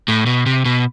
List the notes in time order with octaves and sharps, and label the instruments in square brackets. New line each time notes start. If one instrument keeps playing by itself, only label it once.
[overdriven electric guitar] A2
B2
C3
B2